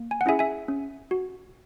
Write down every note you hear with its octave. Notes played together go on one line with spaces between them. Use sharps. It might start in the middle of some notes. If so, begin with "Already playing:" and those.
Already playing: A#3
G#5
F#5
C#4 E4 G#4 E5 G#5
E5 G#5
C#4
F#4